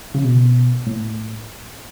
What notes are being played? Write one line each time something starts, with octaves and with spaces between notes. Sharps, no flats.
C#3
B2
A2